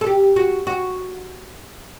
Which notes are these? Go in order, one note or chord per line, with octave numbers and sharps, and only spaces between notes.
A4
G4
F#4
F#4